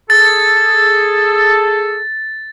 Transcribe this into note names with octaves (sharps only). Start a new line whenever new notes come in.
G#4 A4 A6